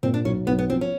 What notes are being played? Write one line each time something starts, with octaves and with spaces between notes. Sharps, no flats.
A#2 C4
D4
B1 C#4
B1 B3
B3
F3 C4
C#4